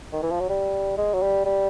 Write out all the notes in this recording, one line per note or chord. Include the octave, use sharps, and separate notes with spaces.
D#3
E3
F3
F#3
G3
G#3
F#3
G3
G3